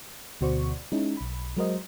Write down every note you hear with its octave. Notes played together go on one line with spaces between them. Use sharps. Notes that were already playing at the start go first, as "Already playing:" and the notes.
D2 B2 F#4 C5 D5 C#6
G#3 C#4 D#4 E4
B1 B5
F#3 G#3 F#4 A#4 C5 D#5